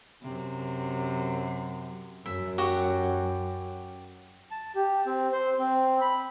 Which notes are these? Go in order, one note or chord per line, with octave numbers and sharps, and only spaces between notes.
F#2 C3
F#2 E5
F#4 G4 F#5
A5
G4
C4
C5
C4
B5